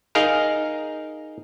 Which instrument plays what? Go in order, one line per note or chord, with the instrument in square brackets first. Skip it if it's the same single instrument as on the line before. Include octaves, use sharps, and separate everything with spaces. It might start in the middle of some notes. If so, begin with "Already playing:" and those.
[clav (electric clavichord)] D#4 G#4 A#4 F5 A#5